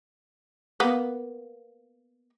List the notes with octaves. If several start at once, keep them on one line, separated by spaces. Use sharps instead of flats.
A#3 B3